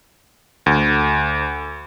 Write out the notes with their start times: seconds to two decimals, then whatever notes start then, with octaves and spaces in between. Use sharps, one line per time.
0.66 D2